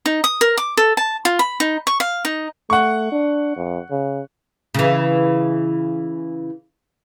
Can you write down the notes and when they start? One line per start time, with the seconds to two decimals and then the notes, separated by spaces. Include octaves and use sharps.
0.06 D#4
0.24 D#6
0.41 A#4
0.57 D6
0.77 A4
0.97 A5
1.25 F4
1.39 B5
1.60 D#4
1.87 C#6
2.00 F5
2.25 D#4
2.70 A3 F#5 C#6
3.12 D4
3.57 F2
3.90 C#3
4.74 C#3 E3